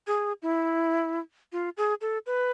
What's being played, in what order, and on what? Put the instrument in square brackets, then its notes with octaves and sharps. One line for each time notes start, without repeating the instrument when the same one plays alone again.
[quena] G#4
E4
F4
G#4
A4
B4